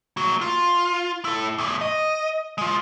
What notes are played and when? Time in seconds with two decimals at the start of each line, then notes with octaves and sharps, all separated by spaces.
0.17 A#3 F#4
0.41 F4
1.25 E4 A4
1.58 E2 A2
1.81 D#5
2.58 G#3 F4